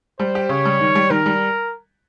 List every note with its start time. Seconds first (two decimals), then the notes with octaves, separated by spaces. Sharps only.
0.19 G3 C5
0.35 G4
0.49 C#3 C#5
0.65 G3
0.80 D#3
0.95 G3
1.10 D#3 A#4
1.26 G3